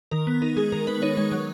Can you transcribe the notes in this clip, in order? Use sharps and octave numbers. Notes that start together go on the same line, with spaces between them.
D#3 A#4
B3
D#4 A#4
G#3 G#4
D#3 A#4
B3 B4
D#4 C#5
G#3 C#5
F#3